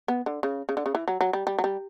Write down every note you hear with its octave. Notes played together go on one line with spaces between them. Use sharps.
B3
D3
C#3
C#3
D3
C#3
E3
F#3
F#3
G3
G3
F#3
G3